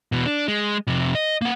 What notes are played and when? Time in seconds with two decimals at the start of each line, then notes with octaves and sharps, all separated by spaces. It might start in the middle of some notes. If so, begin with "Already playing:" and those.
0.12 E2 B2
0.26 D4
0.48 G#3
0.87 F2 C3
1.15 D#5
1.42 A#3 F#5